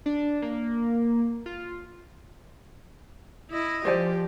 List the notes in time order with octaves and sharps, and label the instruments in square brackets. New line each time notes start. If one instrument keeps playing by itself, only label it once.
[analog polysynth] D4
A#3
F4
[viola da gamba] E4 D#5
[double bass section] F3 [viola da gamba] G4 [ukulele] C5 D5 G#5